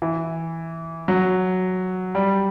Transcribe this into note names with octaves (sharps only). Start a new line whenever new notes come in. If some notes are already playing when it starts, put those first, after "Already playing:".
E3
F#3
G3